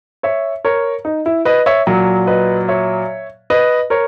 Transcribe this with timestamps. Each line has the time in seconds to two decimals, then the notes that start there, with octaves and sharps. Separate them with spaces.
0.23 C#5 E5
0.65 A#4 C#5
1.05 D#4
1.26 E4
1.45 B4 D#5
1.66 C#5 E5
1.87 A#2 F#3
2.27 B4 D#5
2.68 C#5 E5
3.50 B4 D#5
3.90 A#4 C#5